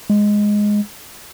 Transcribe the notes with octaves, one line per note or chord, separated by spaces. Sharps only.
G#3